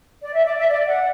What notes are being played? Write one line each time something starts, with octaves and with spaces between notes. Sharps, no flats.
D5
E5
D5
E5
D5
F#5